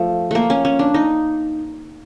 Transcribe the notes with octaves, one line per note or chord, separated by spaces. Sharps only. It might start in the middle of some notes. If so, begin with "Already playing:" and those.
Already playing: F3 A3
A3 A#3
C#4
C#4
D4
D#4